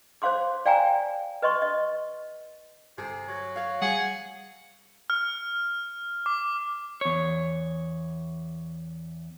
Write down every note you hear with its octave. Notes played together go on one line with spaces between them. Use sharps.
C5 C#5 F5 C6 D6
D5 F5 G5 G#5 A#5
B4 D#5 C6 C#6
D#5
G1 C3 G#4 A4
F#3
C#5 F5
G3 G#4 F#5
F6
D6
E2 C#5